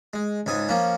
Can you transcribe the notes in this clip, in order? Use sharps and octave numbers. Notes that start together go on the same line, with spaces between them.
G#3
C#2 G#2 G#5 D#6
F3 A#3 C#4